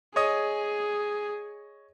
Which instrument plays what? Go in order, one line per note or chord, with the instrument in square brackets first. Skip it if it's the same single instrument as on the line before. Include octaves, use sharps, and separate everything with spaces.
[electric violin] G#4 [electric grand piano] C#5 D#5 D#6